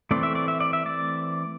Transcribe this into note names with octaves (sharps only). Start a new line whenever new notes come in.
E3 A3 C4 D5
E5
D5
E5
D5
E5
D5